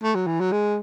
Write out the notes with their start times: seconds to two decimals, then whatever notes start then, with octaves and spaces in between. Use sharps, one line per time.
0.03 A3
0.15 F#3
0.27 E3
0.40 F#3
0.52 G#3